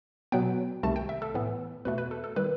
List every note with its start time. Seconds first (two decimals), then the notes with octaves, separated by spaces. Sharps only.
0.32 B2 F#3 B3 G5
0.83 C2 C3 D#3 A3 A5
0.96 G5
1.09 E5
1.22 A4
1.34 A2 E3 B3
1.85 E2 B2 A3 B4
1.98 B4
2.11 A4
2.24 A4
2.36 D#3 G3 B4